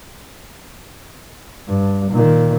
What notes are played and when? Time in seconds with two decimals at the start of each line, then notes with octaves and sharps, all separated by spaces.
1.68 G2
2.11 A#2 D#3